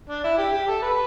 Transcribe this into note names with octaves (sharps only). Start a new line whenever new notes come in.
D4
E4
G4
G4
A4
B4